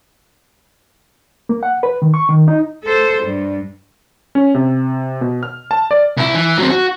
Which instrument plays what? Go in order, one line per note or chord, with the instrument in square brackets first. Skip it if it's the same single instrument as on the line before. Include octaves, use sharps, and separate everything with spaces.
[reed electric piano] A#3
F#5
B4
D#3
C#6
D#3
D#4
[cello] A4 C5
G2
[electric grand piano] C#4
C3
B2
F6
A5
D5
[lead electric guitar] C2 E4
E3
F#3 C4
F#4